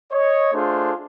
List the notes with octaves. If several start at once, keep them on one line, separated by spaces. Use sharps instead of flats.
C#5 D#5
A3 D4 F4 G#4 A4 C5